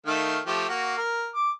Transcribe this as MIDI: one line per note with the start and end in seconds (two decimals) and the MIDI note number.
0.06 0.39 51
0.06 0.39 57
0.06 0.39 77
0.47 0.65 53
0.47 0.65 57
0.47 0.65 67
0.69 0.96 58
0.69 0.96 66
0.98 1.29 70
1.35 1.50 86